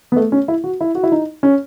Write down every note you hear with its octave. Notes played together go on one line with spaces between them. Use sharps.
B3
A3
C#4
E4
F#4
E4
F#4
E4
D#4
C#4